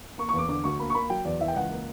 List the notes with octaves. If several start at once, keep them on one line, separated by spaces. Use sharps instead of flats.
A#3 C#6
C#6
E2
D6
D3 D6
D2 C#6
A#3 B5
C#6
A#3 B5
F#3 G5
E2 D5
E3 E5
G5
C#2 F#5
A#3